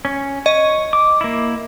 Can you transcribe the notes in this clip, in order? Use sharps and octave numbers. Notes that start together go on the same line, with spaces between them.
C#4
C#5 D#5
D6
A#3 E4